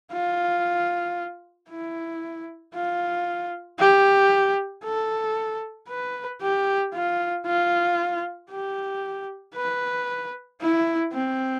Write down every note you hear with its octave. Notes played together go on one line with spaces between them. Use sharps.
F4
E4
F4
G4
A4
B4
G4
F4
F4
G4
B4
E4
C4